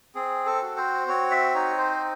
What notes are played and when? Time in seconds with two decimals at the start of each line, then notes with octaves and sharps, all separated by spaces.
0.15 C4 G#4
0.46 A4
0.62 F#4
0.77 C5
1.08 C4 C#5
1.31 E5
1.54 D#4 C#5
1.78 C5